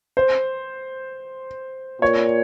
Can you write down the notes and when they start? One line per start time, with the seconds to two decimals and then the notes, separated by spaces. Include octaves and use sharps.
0.17 C5
2.01 A#2 C#5